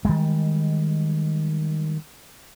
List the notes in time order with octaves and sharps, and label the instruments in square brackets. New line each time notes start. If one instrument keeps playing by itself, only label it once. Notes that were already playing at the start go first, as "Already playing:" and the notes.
[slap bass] D#3 G3 G#3